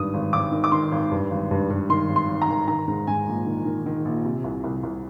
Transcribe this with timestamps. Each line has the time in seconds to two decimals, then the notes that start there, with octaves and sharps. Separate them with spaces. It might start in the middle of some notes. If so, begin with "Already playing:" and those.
Already playing: G#1 G2 D#3 D#6
0.14 G#1
0.33 G#1 D6
0.52 D#3
0.64 D6
0.72 D#3 C6
0.92 G#1
1.11 G2
1.31 G#1
1.51 G2
1.70 G2
1.89 D#3 C6
2.09 G#1
2.16 C6
2.29 G#1
2.42 A#5
2.48 D#3
2.68 D#3 A#5
2.88 G#2
3.07 G#2 G#5
3.27 A#1
3.46 D#3
3.65 D#3
3.86 D#3
4.05 A#1
4.25 C3
4.44 C2
4.64 C2
4.83 C2